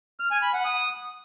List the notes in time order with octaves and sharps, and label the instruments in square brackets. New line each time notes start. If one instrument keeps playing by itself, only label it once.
[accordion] F6
G#5
B5
F#5
D#6